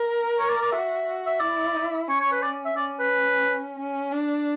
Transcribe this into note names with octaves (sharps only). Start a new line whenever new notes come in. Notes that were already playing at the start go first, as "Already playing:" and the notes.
Already playing: A#4
C#5
D5
D5
F#4 E5
F#4
E5
E4 D5
C#4 C#5
C#5
B4
D5
E5
C#4 D5
B4
C#4
D4